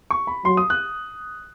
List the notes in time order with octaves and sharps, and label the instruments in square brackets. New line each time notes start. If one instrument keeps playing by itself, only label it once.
[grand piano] C#6
B5
[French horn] F#3 [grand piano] C6
[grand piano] D#6
F#6